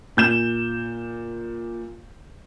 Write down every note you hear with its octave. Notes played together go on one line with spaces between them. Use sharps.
A#2 G6 E7